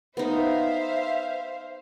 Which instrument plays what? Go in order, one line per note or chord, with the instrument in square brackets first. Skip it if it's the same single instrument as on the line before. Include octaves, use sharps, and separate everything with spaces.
[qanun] B3 D#4 [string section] C5 E5 F5